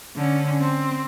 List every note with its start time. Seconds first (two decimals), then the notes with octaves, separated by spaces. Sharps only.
0.15 D3 C#4
0.60 C4